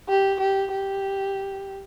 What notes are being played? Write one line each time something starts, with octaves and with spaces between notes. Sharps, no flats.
G4
G4
G4